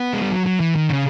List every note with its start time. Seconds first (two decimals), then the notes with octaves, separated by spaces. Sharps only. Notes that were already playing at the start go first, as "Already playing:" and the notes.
Already playing: B3
0.13 G#3
0.22 G3
0.32 F#3
0.46 F#3
0.60 E3
0.75 D#3
0.89 C#3